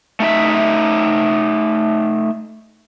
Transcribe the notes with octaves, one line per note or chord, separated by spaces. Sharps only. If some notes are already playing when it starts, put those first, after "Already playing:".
A3 D#4 E5